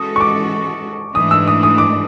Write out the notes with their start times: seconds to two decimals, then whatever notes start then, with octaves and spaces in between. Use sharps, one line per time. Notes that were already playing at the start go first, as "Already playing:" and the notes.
Already playing: E3 G#3 C#4 F#4 A4 D#6
0.16 C#6
0.21 D6
1.15 G#2 E3 A3 D4 D#6
1.31 E6
1.48 D#6
1.63 D#6
1.78 D6